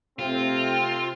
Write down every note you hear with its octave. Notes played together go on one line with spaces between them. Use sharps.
C3 A3 C4 F4